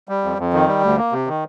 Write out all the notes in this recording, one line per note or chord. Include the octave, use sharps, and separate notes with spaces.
G3
F2
F2
D#3
G3
D2
A#3
C3
D#3